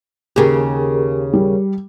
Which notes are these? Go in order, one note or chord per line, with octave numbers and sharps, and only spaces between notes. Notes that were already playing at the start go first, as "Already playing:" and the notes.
D#2 C#3 G4 G#4 A#4
G3